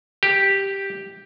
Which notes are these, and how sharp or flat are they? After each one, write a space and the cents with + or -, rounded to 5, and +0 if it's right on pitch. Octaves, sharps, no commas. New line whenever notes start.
G4 +0 F#5 +40